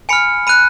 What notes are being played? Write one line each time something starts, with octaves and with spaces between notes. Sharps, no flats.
G#5 B5 F6 C#7
B5 F#6 D#7